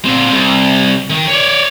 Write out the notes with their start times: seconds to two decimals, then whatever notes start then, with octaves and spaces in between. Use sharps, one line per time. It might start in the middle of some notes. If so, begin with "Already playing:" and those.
0.05 A#2 C4
0.32 C2
1.10 D#3
1.28 C#5 D5